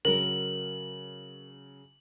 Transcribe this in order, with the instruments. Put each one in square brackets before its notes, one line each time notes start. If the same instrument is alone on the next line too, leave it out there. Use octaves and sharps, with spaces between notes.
[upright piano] C#3 F#3 [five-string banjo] A#4 [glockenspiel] F#7